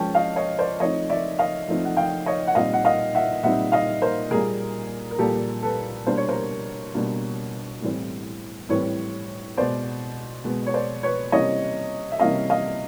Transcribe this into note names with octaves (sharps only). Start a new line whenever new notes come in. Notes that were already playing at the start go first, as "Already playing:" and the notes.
Already playing: F3 G#3 C#4 G5 A5
D#5 F5
C#5 D#5
C5 D5
F3 A3 C4 D#4 C#5 D#5
D5 E5
D#5 F5
F3 A3 C4 D#4
F#5
F5 G5
C#5 D#5
F#5
A#2 G3 C4 D#4 D#5 F5
F#5
D#5 F5
E5 F#5
A#2 G3 C4 D#4 E5 F#5
D#5 F5
A#4 C5
A#2 G3 A#3 G#4 A#4
A#4
A#2 G3 A#3 G4 A4
A4 B4
B2 G3 A#3 D4 C5
C#5
A#4 C5
B2 G3 A#3 D4
A2 E3 G3 C4
A2 E3 G3 C4 B4 C#5
B2 G#3 B3 C5 D5
B2 G#3 B3
C#5
C5 D5
B4 C#5
C3 E3 G3 A#3 C#4 C#5 D#5
E5
C3 E3 G3 A#3 C#4 D#5 F5
D#5 F5